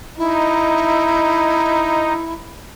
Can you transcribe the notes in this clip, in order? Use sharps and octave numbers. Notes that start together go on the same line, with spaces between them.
D#4 E4